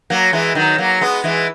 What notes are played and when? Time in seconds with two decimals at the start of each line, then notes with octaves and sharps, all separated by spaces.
0.10 F#3 A#3
0.33 E3 G#3
0.55 D#3 F#3
0.78 F#3 A#3
1.01 G#3 B3
1.24 E3 G#3